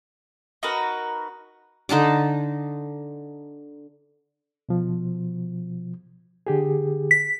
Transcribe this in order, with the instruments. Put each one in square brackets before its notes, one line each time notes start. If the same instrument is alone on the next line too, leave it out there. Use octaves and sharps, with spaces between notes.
[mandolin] D#4 F#4 A#4 B4
[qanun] D3 D#4 A5 D6
[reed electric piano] B2 F3
D3 G4 G#4
[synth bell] B6